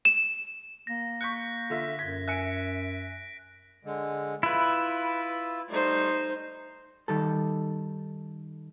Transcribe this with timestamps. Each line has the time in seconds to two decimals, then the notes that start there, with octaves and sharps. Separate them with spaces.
0.05 E7
0.87 A#3 A#6
1.21 C#6 F#6 G6 B6 C#7
1.70 D3 F4 E5
1.99 F#2 G#6 B6
2.28 E5 G#5 F#6 C#7 D7
3.85 D3 G#3
4.43 E4 F4 B4
5.70 G3 A3 D#4 C5
7.08 D#3 G3 A4